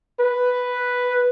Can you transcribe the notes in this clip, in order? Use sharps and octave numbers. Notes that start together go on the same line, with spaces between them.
B4